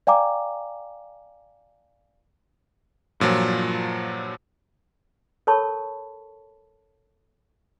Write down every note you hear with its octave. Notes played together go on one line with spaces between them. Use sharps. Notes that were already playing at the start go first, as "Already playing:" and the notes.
D5 F5 G5 G#5 A#5 D6
G2 A#2 F3 F#3
A4 A#4 C#5 A5 B5 C#6